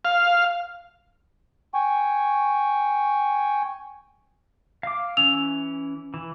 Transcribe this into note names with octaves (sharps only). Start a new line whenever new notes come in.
F5
G5 G#5 C#6
F5 D6
E3 C#4 E6 F7
E3